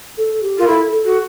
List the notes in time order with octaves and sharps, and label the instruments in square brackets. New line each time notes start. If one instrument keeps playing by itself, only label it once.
[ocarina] A4
G4
[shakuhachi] F4 [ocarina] A#4
[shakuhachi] E4 [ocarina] A4
[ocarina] A4
[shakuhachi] F#4